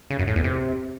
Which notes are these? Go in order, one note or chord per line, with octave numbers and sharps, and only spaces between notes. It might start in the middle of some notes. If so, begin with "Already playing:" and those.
C#3
F#2
A2
E2
C3